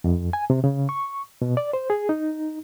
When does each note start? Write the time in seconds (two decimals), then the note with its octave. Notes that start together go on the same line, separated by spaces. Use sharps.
0.04 F2
0.33 G#5
0.50 C3
0.64 C#3
0.89 C#6
1.42 B2
1.57 D5
1.73 C5
1.90 G#4
2.09 D#4